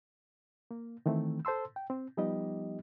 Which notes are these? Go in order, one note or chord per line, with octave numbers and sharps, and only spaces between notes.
A#3
D#3 E3 A3 C4
A4 C5 A5 C6 E6
G5
C4
F3 G3 B3 D#4 G4 D#5